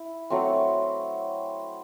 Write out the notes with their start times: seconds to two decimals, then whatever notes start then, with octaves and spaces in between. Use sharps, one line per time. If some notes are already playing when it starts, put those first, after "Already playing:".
Already playing: E4
0.30 F#3 A3 C4